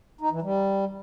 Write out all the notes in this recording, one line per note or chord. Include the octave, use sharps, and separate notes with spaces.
D#4
E3
G3